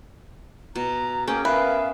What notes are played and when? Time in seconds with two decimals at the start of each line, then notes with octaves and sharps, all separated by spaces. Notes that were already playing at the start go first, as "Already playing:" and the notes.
0.75 B2 A#5
1.28 A#3 C#4 G#4 G5
1.45 B3 A#4 B4 E5 F5